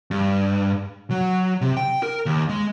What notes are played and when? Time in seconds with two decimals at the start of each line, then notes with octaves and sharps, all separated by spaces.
0.11 G2
1.10 F#3
1.61 C3
1.77 G5
2.03 A#4
2.26 D#2
2.49 G#3